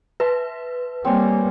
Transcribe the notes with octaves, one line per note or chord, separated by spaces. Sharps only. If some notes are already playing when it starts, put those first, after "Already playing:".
B4 E5 A5 C6
G3 A#3 C4 C#5 G#5